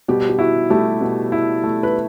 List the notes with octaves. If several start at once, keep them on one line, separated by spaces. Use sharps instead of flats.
B2 G3 G4
G4
E4 F#4
G3 A3 G4
B2
E4
A3
B4